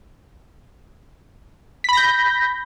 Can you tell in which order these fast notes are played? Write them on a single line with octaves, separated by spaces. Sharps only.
B6 B5 A#6 G6